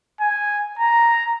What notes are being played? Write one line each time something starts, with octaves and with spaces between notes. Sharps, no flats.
G#5
A#5